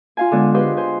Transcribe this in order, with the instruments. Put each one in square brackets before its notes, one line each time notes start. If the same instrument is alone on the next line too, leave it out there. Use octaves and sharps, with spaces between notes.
[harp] F4 F5 G#5
D3 G#3 B3 A4 D5
G4 G#4 B4 C5 D#5 F5
C5 G#5